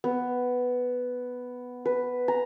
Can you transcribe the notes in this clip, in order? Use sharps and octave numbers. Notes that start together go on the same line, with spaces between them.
B3
B4
A#5